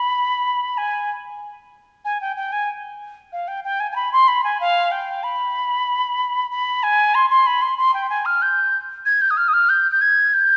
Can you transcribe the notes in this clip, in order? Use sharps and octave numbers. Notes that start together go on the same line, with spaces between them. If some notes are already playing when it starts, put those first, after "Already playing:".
Already playing: B5
G#5
G#5
G5
G5
G#5
F5
G5
G5
G#5
G#5
B5
C6
B5
G#5
F5
G5
B5
B5
G#5
C6
C6
B5
C6
C6
G5
G#5
F6
G6
G#6
G6
D#6
F6
D#6
F6
G6
G6
G#6
G6